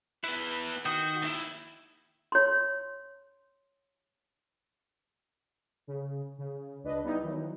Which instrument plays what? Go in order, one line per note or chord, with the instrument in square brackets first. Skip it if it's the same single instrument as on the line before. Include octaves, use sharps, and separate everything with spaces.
[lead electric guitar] B3 E4 [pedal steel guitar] B4
[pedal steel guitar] D#3 G5 D#6 [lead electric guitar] F#4
[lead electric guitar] D#2 E4
[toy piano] C#5 C6
[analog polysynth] C#3
C#3
C#2 D4 B4 D#5
G3 B3 D#4 E4
D#3 E3 F#3